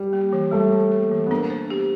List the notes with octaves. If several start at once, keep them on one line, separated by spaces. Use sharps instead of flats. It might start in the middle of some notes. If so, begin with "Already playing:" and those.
Already playing: G3
A#3
E3
G3 A3
E3
A#3
E3
B3
A#3 D4
C5
G4